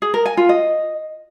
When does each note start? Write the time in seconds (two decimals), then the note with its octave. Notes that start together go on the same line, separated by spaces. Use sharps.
0.02 G#4
0.14 A#4
0.26 G#5
0.37 F4
0.49 D#5